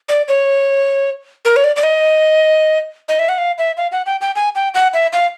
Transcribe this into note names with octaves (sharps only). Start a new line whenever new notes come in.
D5
C#5
A#4
C#5
D5
D5
D#5
D#5
E5
F#5
F5
E5
F5
F#5
G5
G5
G#5
G5
F#5
E5
F5